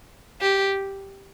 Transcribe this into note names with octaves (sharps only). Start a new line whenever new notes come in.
G4